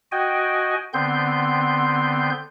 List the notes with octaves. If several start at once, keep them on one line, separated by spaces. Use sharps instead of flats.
F#4 D#5 G5 G#5
D3 B3 C4 C6 G6